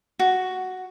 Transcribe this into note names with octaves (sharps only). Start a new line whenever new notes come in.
F#4